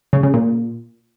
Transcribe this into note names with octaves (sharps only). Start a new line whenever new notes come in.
C#3
C#3
A#2